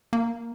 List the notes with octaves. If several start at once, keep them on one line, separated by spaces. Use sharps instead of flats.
A#3